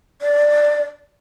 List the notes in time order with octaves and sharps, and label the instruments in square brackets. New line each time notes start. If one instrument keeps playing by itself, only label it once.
[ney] D5